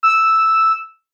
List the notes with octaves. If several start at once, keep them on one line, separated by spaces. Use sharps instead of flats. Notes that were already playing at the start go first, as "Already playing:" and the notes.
E6